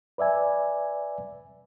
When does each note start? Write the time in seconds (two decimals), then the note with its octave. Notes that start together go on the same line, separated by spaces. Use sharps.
0.18 B4 D5 E5 G#5